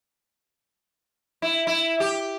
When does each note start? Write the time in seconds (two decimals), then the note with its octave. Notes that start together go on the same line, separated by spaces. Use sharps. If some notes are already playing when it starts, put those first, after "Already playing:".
1.42 E4
1.67 E4
2.00 G4